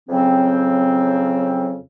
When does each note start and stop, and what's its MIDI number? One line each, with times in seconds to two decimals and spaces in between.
0.09 1.78 41
0.09 1.78 49
0.09 1.78 54
0.09 1.78 60